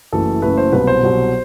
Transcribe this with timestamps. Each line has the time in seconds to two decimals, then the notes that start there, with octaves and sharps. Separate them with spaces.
0.12 F#1 F#2 E3 A3 A4
0.42 F#1 F#2 E3 A3 B4
0.57 C5
0.72 C2 B2 F#3 B4
0.87 C5
1.03 C2 B2 F#3